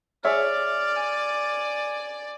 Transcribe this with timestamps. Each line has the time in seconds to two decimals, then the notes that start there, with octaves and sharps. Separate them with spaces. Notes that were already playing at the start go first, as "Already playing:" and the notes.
0.25 G#4 C#5 D5 E5 F6
0.96 G#5